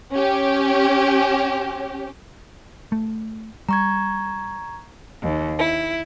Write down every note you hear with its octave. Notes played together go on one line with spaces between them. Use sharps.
C#4 G4
A3
G3 A#5 C#6 G#6
D#2
E4